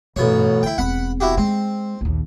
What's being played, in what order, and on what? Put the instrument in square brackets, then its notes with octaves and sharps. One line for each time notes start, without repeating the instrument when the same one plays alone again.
[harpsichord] A1 B2 C#5 [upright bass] G2
[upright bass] D2 [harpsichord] E4 G5
[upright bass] E1 C4 [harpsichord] F#5 B5
[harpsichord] E4 F#4 G4
[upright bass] G#3 [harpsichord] C4
[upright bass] A#1 D#2